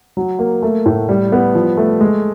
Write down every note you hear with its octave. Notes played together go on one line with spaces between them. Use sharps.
F#3
A#3
A3
A2
G3
B3
F3
A3
G#3